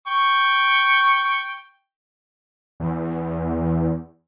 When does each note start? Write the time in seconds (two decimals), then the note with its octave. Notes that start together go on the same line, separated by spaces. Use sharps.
0.07 G5 C#6
2.80 E2